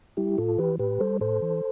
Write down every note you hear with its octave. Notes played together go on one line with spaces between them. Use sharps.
G3 E4 G4
A2 F4 A4
E3 G4 B4
A2 G4 B4
G3 A4 C5
A2 A4 C5
E3